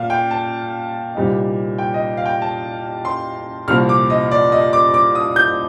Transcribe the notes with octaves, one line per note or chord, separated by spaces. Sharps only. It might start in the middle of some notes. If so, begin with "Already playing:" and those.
Already playing: A#2 F5
G5
A5
C2 A#2 G3 C4 D#4
G5
D#5
F5
G5
A5
C6
C2 A#2 F3 A#3 F6
D6
D#5
D5
D#5
D6
D6
D#6
G6